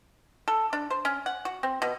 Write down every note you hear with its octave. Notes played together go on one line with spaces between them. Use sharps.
A4
D4
C5
C#4
F#5
F#4
C4
B2